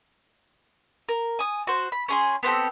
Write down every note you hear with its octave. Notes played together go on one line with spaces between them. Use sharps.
A#4
G#5 D#6
F#4 C5
B5
C#4 G#4 C6
B3 C4 G4 A4